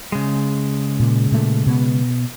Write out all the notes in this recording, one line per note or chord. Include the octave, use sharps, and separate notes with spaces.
C#3 G#3
A#2
A#2 A3
B2 B3